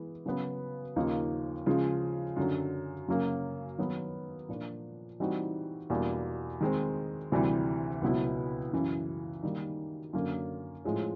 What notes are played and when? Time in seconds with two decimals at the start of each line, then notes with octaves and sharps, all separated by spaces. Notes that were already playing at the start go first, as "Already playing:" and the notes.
Already playing: E3 G#3 B3
0.26 C#3 F#3 B3
0.96 D#2 C#3 F3 A#3 D#4
1.66 C#3 F3 G#3
2.36 F#2 D3 F#3
3.08 F#2 C#3 F#3 A#3
3.78 D#3 F#3 B3
4.49 A#2 F3 A#3 D4
5.20 E3 G3 C4 D#4 F#4
5.90 E2 B2 G3 A#3 D4
6.60 D#3 G#3 C4
7.32 D2 C3 E3 G3
8.01 C#2 B2 F#3 B3 E4
8.73 F#2 C#3 E3
9.43 D#3 G3 A#3 D#4
10.13 F#2 D3 F#3 A#3
10.84 A2 F3 G#3 C#4